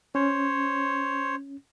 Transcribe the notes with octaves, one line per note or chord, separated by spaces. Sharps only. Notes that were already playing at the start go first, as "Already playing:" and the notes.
C#4 C5 C#5